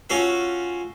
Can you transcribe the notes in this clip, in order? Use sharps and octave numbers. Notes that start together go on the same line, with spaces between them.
C#4 F4 F#4 A4 F5